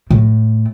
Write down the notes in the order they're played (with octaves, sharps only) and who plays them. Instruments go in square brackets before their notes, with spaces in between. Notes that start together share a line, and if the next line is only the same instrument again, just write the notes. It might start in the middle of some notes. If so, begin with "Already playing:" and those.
[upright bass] A2